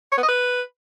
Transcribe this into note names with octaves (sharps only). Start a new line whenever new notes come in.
C#5
B3
D#5
B4